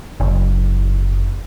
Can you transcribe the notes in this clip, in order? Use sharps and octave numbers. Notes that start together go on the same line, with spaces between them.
F#1